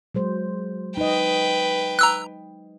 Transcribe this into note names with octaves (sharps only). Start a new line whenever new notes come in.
F#3 G#3 C5
D#4 B4 D#5 G5
A#5 E6 F#6